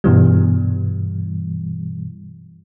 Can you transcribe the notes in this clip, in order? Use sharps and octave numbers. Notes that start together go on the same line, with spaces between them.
G2 B2 E3 G3